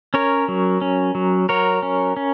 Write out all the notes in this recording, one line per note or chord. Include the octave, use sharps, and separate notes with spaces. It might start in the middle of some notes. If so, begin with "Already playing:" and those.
C#4 A#4 C#5
F#3
C#4
F#3
F#3 A#4 C#5
C#4
C#4